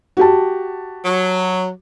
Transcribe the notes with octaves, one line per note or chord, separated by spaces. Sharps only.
F#4 G4 A5
F#3